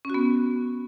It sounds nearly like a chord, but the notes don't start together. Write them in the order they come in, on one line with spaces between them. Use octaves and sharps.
C#4 F#4 B3